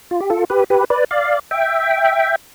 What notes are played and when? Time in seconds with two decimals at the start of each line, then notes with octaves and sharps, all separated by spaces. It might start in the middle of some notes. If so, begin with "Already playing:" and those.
0.11 F4
0.20 G4
0.30 F4 A4
0.50 G4 B4
0.70 G4 B4
0.90 B4 D5
1.11 D5 F5
1.51 E5 G5